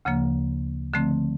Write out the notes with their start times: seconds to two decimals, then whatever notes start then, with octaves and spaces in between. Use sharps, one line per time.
0.05 D2 C#3 F3 A#3
0.94 D3 F3 A3 C4